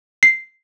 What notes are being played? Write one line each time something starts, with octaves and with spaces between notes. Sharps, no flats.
C7